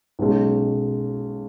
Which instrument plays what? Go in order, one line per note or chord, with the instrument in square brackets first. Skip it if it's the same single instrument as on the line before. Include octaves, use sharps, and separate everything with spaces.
[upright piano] B1 B2 G#3 C#4